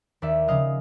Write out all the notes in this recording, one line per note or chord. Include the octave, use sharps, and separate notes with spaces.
D#2 D5 E5
C#3 F3 D#5 F5